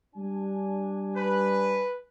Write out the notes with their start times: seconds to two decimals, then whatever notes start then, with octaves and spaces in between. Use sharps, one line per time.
0.16 G3 D4 G#5
1.16 B4